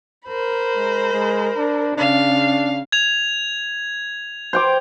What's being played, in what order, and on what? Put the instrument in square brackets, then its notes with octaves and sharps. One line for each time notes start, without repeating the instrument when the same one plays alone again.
[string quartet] A#4 C5 B5
[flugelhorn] G#3
G#3
D4
[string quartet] C#3 F5 [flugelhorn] D4
[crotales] G#6 F7
[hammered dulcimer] C5 G5 D6